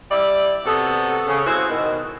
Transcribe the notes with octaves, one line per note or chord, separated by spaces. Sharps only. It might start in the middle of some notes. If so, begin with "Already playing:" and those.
G3 E4 D5
C3 B3 F#4 A4
C#3
G#3 C4 E4 F#4 C5
B2 D#3